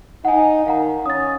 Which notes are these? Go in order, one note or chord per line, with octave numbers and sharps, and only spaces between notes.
D#4 F#5 G#5
D#3 F5 F#5 A#5
C#4 D#6 A6